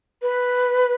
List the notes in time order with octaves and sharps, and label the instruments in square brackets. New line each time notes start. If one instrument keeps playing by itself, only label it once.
[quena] B4